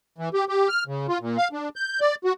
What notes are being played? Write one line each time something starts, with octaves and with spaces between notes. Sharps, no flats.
E3
G4
G4
F6
C#3
F4
A#2
F5
D4
G6
D5
F#4